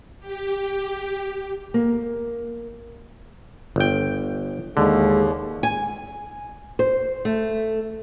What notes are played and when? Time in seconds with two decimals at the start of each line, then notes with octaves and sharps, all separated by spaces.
0.20 G4
1.74 A#3
3.76 G1 G5
4.77 D#2 D3 G#3
5.63 G#5
6.79 C5
7.25 A3